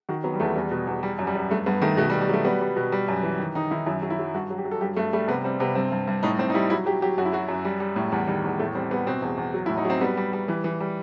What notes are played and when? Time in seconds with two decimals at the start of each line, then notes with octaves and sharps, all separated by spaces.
0.09 D#3 F#4
0.24 F#3 B3
0.34 G3
0.40 E2 A3
0.56 E2 G3
0.71 B2
0.87 E2
1.03 G3
1.19 F#2
1.27 G3
1.35 F#2
1.50 G2 A3
1.66 G2 B3
1.82 D#3 A3
1.97 B2 A3
2.10 G3
2.14 B2
2.21 G3
2.29 F#3 A3
2.44 G3 B3
2.61 G3
2.76 B2
2.92 G3
3.08 F#2
3.23 E3
3.39 D#3
3.55 D#3 D#4
3.71 D#3 E4
3.86 F#2 E4
4.02 F#3
4.10 E4
4.19 F#3
4.34 G2 F#4
4.50 F#3
4.58 G4
4.65 F#3
4.71 A4
4.81 G2 G4
4.96 G2 A3
5.13 G3 A3
5.28 C3 B3
5.44 G3 C4
5.60 C3 B3
5.75 G2 C4
5.92 G2
6.08 G2
6.23 A2 D#4
6.39 A2 C4
6.50 D#4
6.54 G3 E4
6.70 F#3 E4
6.86 F#3 G4
7.02 F#3 G4
7.18 F#2 F#4
7.25 E4
7.33 F#3 F#4
7.49 F#2
7.65 G3
7.80 G3
7.96 A2
8.12 E2 G3
8.27 D#3 G3
8.44 E2
8.60 A2 A3
8.75 G3 C4
8.91 G3 B3
9.07 B2 C4
9.22 E2
9.38 E2
9.54 F#3
9.66 A2 E4
9.77 D#4
9.85 F#3 C4
10.01 G3 B3
10.17 G3
10.33 G3
10.48 E3
10.64 E3
10.80 G3